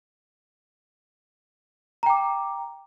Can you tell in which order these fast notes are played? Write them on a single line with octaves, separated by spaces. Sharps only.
A#5 G5 D6